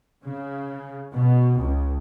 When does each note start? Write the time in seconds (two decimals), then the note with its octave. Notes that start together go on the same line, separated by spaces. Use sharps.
0.23 C#3
1.13 B2
1.57 C#2